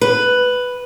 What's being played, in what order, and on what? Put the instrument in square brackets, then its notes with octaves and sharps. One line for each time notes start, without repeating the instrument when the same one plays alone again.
[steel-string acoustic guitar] B4